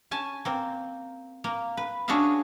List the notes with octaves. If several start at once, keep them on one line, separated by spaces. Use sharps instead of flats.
C#4 G#5 A5
A#3 C4
A#3
B4
C#4 D4 F#4 G#4 E5 F5